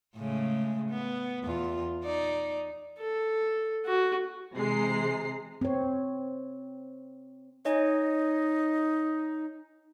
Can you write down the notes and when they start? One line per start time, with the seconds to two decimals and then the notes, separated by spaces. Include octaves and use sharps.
0.17 A2 C#3 G#3
0.89 B3
1.44 E2 F4
2.04 D#4 D5
3.00 A4
3.86 F#4
4.54 C3 E3 G#3 A#5 C7
5.61 C4 C#5
7.65 D#4 C#5 D#5 G#5